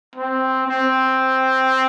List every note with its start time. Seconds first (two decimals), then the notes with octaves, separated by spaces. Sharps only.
0.15 C4
0.67 C4